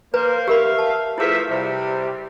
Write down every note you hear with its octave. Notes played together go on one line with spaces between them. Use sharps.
A#3 B4 C5 A#5
G4 A#4 E5 F5 B5
A5
F3 A3 E4 G#4 B4 E5
C3 G3